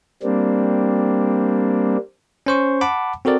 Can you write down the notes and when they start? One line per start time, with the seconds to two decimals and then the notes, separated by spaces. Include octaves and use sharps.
0.23 G3 A#3 C4 D4
2.46 C#4 C5 C#6
2.81 F#5 A5 B5 D6
3.25 C4 F#4 A4 A#4 D5